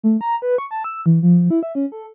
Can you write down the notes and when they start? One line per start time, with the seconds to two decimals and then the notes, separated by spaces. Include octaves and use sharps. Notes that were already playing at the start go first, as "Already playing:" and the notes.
0.04 A3
0.21 A#5
0.42 B4
0.58 C#6
0.71 A5
0.84 E6
1.06 E3
1.23 F3
1.50 E4
1.63 E5
1.75 C#4
1.92 A4